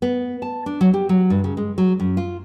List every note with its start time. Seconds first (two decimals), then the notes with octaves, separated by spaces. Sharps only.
0.02 B3
0.42 A5
0.66 D4
0.81 F#3
0.94 G4
1.09 F#3
1.30 G2
1.44 C#3
1.57 G#3
1.78 F#3
2.00 F#2
2.17 F4